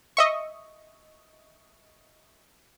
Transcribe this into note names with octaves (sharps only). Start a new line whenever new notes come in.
D#5 E5 C#6